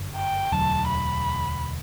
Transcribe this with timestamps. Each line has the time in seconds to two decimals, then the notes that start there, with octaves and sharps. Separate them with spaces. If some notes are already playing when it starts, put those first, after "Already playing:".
Already playing: G1 F#2 D3
0.16 G5
0.52 E1 D2 D3 F#3 A5
0.88 B5